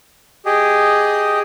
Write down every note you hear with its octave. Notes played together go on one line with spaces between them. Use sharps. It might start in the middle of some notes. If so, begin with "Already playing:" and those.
G4 G#4 D#5